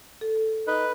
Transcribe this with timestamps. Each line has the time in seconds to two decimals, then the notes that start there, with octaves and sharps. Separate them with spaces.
0.21 A4
0.67 D#4 B4